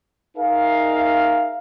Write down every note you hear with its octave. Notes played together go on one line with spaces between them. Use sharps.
D#4 G#4 A#4 E5 F5